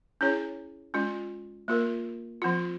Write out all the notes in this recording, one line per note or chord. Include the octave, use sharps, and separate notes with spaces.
C#4 E4 G#4 C#5
G#3 C#4 F4
A#3 F4 A#4
F3 C4 F4